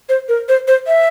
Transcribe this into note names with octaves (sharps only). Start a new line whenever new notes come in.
C5
A#4
C5
C5
E5